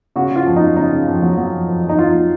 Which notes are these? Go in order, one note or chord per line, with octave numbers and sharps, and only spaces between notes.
C#3 F#4
C#3
F4
F2
D#4
F#3
C#3 D#4
C#3
F2
F#3
F#3
F2
F2
F2
D#4
F2 F4
F#3